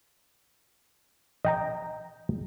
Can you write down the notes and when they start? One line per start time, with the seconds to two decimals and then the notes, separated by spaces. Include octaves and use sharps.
1.45 D#5 G5 A#5